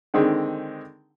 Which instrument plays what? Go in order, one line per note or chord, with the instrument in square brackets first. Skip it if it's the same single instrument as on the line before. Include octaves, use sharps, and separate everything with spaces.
[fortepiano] D3 D#3 G#3 C4